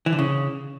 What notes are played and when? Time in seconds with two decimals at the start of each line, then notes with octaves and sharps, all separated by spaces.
0.06 E3
0.12 D3
0.19 C#3